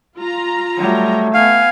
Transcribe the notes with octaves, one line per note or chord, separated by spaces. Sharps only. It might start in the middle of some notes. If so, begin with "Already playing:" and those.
F4 A#5
F#3 G3 A3
B3 F5 G#5